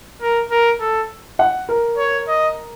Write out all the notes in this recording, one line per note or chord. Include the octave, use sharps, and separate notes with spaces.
A#4
A#4
A4
F#5
A#4
C#5
D#5